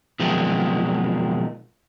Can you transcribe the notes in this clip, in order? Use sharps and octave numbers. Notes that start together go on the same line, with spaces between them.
B2 D#3 F3 F#3 G#3 C4